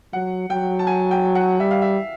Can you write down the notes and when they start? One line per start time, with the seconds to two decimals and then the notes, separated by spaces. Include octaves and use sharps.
0.13 F#3 F#5
0.50 F#3 G5
0.79 A5
0.87 G#5
1.11 G5
1.35 F#5
1.60 G3 E5
1.71 F5
1.82 E5